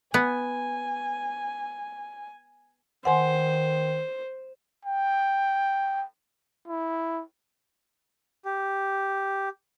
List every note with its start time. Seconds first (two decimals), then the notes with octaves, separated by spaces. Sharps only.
0.14 B3 G#5
3.05 D#3 C5 F#5 G#5 C6
4.85 G5
6.68 E4
8.45 G4